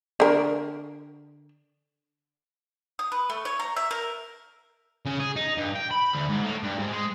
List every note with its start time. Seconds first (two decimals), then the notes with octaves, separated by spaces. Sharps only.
0.20 D3 A#4
2.99 D#6
3.12 B4
3.30 A3
3.45 C#5
3.59 A#5
3.76 E5
3.91 A#4
5.06 C#3
5.20 G#4
5.36 D#4
5.57 G2
5.75 G5
5.91 B5
6.13 D2
6.29 G#2
6.44 A2
6.63 G2
6.79 G#2
6.92 G#3